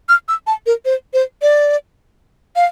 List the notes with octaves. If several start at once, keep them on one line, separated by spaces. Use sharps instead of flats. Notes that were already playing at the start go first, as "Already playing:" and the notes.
F6
E6
A5
A#4
C5
C5
D5
F5